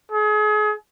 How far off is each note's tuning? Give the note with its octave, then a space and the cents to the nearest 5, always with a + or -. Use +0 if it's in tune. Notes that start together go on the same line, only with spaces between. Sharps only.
G#4 +35